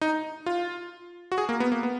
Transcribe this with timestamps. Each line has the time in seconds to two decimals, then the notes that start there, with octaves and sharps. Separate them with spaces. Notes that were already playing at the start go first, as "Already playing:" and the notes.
0.01 D#4
0.46 F4
1.32 F#4
1.38 G#4
1.49 A#3
1.60 B3
1.72 A#3
1.83 B3